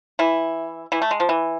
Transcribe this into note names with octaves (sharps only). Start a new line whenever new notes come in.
E3 E4
E3 E4
A3
G#3
F3
E3